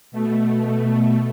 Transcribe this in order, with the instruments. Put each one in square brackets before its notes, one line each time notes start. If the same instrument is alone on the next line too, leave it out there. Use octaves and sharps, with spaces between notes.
[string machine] B2 A3